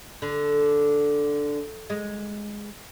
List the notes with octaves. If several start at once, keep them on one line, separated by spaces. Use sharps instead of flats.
D3
G#3